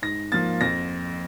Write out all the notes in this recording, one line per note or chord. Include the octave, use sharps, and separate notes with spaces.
G#2 A#6
F3 A#3 A6
F2 A#6